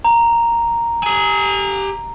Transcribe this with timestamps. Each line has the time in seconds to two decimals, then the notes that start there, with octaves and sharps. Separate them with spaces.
0.05 A#5
1.03 G4 G#5